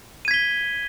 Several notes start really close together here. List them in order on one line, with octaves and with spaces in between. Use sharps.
D#7 G#6 B6 G7